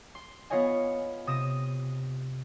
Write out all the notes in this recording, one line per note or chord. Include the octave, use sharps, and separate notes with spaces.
C6
B3 F4 C#5 D#5 G#5
C3 D#6 A#6 D#7 E7